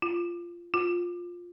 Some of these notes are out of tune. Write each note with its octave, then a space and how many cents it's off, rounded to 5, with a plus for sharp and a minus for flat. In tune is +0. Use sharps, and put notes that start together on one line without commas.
F4 -15
F4 +10